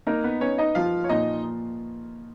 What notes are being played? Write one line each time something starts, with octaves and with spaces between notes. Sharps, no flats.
A#3 D#4 A#4
B3 B4
B3 C#4 C#5
D#4 D#5
F3 F4 F5
C#5
A#2 D#4 D#5